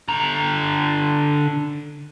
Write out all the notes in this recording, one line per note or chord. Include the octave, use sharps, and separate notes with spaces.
D3 A#5